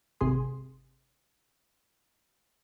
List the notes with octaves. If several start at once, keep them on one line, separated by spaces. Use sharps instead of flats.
G#1 C3 G#4 C6